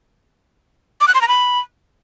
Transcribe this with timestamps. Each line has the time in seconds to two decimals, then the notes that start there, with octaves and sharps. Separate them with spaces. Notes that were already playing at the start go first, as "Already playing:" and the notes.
1.01 D6
1.08 F#6
1.15 C6
1.21 A#5
1.28 B5